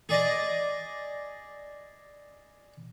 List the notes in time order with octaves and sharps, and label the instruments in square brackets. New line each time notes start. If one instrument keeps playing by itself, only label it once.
[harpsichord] G#4 D5 D#5